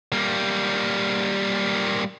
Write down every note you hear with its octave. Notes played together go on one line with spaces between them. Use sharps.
G3 A#3